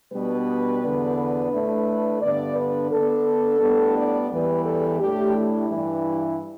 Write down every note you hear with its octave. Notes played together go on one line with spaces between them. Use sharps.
B2 G3 B3 D4 B4
E2 D3 B3 D4
B4
A2 A3 D4
G2 D3 B3 D5
B4
D3 B3 D4 A4
A2 G3 B3 D4
D5
E2 E3 G3 B4
A4
A2 A3 D4 G4
E4
G2 E3 G3